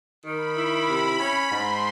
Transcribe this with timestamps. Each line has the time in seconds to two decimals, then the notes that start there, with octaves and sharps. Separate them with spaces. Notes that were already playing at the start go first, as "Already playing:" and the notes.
0.24 D#3 B5
0.56 E4
0.88 C3 B5
1.19 C#4
1.51 G#2 C6